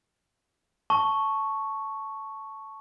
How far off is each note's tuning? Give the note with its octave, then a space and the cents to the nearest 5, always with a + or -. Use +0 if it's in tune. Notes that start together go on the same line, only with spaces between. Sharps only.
A5 +0 C#6 +0